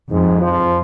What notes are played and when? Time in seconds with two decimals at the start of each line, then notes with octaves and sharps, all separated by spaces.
0.11 F2 G#2
0.41 F3